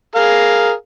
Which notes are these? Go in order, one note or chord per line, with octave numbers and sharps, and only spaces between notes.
G#4 A#4 F5